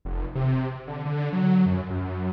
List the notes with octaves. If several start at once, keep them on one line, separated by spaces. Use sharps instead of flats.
F1
C3
D3
D3
F#3
F#2
F#2